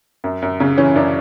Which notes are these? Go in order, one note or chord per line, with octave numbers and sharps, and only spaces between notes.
F#2
F#2
C#3
E3 C#4
F#2 D4